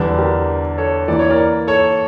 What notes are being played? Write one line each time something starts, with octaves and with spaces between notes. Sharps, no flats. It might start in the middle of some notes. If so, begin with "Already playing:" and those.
Already playing: E2 D3 G3 D4
G4 A#4
A4 C#5
E3 A#3 E4 D5
C#5
A#4 D5
A4 C#5